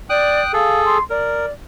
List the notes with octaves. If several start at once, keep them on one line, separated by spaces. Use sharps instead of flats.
D5 G5 D#6 F#6
G#4 A4 F5
C6
A#4 D5